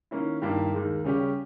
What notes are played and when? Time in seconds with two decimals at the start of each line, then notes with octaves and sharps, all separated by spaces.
0.11 D#3 A#3 C#4 E4
0.42 G2 D#3 A#3 E4 G4
0.73 D#2 D#3 G#3
1.04 C#3 G3 C#4 G4